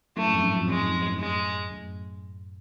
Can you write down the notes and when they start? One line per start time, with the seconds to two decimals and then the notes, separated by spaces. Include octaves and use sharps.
0.17 F#2 A2 A3
0.30 F2 G#2
0.42 F#2
0.56 F2
0.68 F#2 G#3
0.80 F2 G#2
0.96 G#2
1.06 F#2 A2
1.19 G#3
1.71 F#2 A2